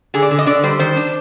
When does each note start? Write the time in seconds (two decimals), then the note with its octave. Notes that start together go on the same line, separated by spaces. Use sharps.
0.14 D3 G#4
0.22 D5
0.31 D3
0.39 D#5
0.46 D3 D5
0.64 G3 C5
0.79 D#3 C5
0.96 D4